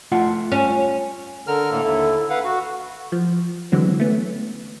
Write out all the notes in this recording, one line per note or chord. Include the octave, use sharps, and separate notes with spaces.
A3 F4 F#5
C#4
D3 A4 A#4 F6
A2 D3 A#3
D#2 D3 E4
B4 F5 F#5
F#4
F3
D3 E3 F#3 G#3 B3 C4
A3 B3 C#4